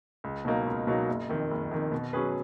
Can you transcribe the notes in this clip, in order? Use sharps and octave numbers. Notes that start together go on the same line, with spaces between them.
C#2
B2 F#3 A#3 D#4
C#2
B2 F#3 A#3 D#4
F#1
F2 D#3
F#1
F2 D#3
B2
F#3 C#4 G#4 B4